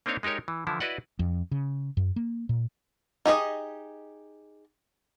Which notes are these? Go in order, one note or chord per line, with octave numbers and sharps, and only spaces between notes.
A#3 C4 D4 D#4 C#5 F5
G#3 D#4 G4 A#4 C#5
E3
D3 E3 F3 E4
E4 F#4 B4 D5 D#5 F#5
F2
C#3
F#2
A#3
A#2
D#4 G4 G#4 D#5